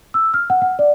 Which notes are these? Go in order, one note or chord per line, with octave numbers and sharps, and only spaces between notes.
E6
F6
F#5
F#5
D5